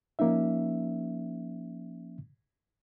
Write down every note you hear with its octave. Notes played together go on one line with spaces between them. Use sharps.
F3 A#3 C#4 D#4 E5